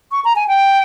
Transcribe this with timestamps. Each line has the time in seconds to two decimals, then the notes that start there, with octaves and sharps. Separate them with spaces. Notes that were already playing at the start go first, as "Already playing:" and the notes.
0.12 C#6
0.25 A#5
0.36 G#5
0.48 G5